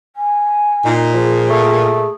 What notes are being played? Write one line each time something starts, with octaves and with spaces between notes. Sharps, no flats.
G#5
A#2 D#4
F3 G#4
A3